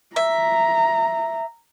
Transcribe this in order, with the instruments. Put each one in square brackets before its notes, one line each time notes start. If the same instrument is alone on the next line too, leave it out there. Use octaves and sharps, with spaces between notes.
[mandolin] E5 [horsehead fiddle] A#5